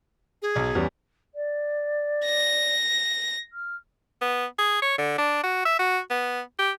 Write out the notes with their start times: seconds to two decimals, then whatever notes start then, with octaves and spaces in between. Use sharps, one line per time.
0.42 G#4
0.56 B1
0.75 E2 G3 C#4
1.34 D5
2.25 A#6
3.52 F6
4.21 B3
4.59 G#4
4.82 C#5
4.98 D3
5.18 D4
5.44 F#4
5.65 E5
5.79 F#4
6.10 B3
6.59 G4